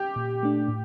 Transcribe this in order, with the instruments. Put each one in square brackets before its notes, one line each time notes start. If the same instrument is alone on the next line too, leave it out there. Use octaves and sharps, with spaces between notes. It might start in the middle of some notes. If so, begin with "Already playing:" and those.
Already playing: [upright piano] G4
[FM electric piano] A#2
A3 D4
A2